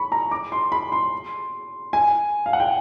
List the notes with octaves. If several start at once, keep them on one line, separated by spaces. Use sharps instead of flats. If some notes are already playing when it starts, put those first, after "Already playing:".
Already playing: B5 C#6
A#5
D6
C6
B5
C6
G#5
F5
F#5
G5